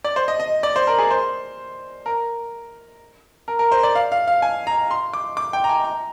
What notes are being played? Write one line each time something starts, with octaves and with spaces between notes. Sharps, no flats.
D5
C5
D#5
D#5
D5
C5
A#4
G#4
C5
A#4
A#4
A#4
C5
D5
F5
F5
F5
G#5
A#5
C6
D6
D6
G5
A#5
G#5
A#5